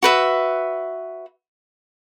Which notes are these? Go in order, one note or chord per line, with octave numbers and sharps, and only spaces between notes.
F#4 B4 E5